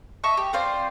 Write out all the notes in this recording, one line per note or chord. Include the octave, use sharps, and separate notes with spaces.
D#5 E5 A5 C#6
G4
C4 F4 C5 D5